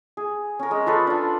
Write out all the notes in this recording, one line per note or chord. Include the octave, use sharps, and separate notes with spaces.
G#4
C#4 A#4
G#3
F4 A4 B4 C#5
D4 F4